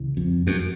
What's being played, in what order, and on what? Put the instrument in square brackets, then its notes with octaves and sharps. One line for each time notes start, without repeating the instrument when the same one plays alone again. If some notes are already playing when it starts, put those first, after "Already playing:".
Already playing: [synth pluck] C#2 C#3 E3
[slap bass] F2
F#2